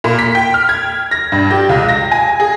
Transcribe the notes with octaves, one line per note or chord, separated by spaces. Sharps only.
A#2
B6
G5
F6
G#6
A#6
G2
G4
C#2
A#6
G#5
G#4